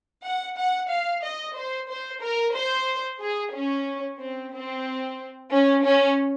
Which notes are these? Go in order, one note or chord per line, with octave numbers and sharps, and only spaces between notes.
F#5
F#5
F5
D#5
C5
C5
A#4
C5
G#4
C#4
C4
C4
C#4
C#4